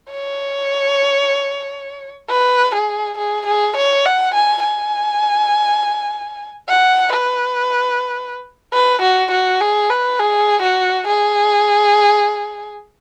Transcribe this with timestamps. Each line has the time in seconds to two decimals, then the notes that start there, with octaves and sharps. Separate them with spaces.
0.11 C#5
2.30 B4
2.74 G#4
3.18 G#4
3.46 G#4
3.77 C#5
4.06 F#5
4.34 G#5
4.64 G#5
6.69 F#5
7.13 B4
8.73 B4
9.02 F#4
9.31 F#4
9.61 G#4
9.90 B4
10.19 G#4
10.62 F#4
11.07 G#4